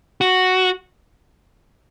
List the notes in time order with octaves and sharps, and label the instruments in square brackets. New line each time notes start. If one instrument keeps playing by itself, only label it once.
[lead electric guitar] F#4